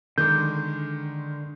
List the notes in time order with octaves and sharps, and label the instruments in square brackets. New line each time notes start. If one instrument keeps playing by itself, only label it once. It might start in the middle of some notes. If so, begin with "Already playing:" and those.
[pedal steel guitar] D3 D6 [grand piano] D#3 G#3 [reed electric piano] G6